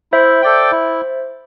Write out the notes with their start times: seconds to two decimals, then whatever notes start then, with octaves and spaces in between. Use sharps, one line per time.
0.12 E4 C5 E5
0.42 A4 D5 G5
0.72 E4